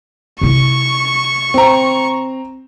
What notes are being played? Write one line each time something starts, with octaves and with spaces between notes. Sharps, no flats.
C3 E4 C#6
C4 A#5